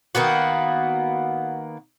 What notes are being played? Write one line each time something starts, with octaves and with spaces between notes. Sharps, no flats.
D#3 A#3 B3 F#4